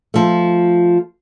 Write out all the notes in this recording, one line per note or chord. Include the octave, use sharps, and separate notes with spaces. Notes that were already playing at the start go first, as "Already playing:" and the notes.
F3 A3